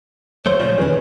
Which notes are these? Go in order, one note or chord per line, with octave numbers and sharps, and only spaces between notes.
F#3 A3 C5 C#5
A#2 C#3 F3 C#5 D5
D#3 C#4 G#4 B4